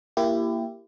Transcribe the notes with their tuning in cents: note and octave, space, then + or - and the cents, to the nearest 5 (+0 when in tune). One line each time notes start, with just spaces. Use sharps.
A#3 +0 E4 +25 G4 +0